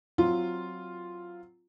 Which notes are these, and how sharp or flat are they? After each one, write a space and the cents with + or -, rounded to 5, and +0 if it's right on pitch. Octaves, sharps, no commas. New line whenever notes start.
F#3 +0 C4 +0 F4 +0